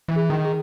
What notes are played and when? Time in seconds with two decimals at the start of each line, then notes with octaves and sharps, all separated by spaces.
0.08 E3
0.16 G#4
0.30 D#3
0.45 G#4